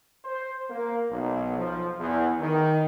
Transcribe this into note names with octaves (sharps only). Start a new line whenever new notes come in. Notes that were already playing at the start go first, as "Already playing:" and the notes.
C5
A#3
B1
F3
E2
D#3